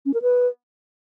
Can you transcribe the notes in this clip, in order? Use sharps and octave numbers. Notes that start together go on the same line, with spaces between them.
C#4
A#4
B4